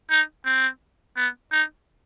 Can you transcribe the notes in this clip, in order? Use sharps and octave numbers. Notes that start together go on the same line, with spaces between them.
D#4
C4
B3
D#4